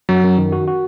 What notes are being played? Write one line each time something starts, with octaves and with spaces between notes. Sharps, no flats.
F#2 F#3
F#2
D#3
F#4
F#4